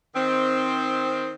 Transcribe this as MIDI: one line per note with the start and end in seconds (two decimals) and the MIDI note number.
0.15 1.33 51
0.15 1.33 60